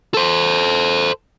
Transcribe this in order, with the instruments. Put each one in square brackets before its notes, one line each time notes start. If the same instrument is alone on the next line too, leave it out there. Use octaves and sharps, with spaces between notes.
[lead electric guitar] A4 C5